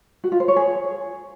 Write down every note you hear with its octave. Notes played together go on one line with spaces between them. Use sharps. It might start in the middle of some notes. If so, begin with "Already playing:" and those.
F#4
F4
C5
C#5
G#4